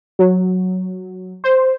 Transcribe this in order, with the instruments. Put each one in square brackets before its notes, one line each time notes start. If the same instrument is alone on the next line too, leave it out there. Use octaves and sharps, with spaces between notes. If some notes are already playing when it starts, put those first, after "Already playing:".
[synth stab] F#3
C5